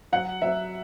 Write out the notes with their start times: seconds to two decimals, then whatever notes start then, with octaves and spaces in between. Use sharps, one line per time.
0.12 F#3 F#5
0.42 F#3 E5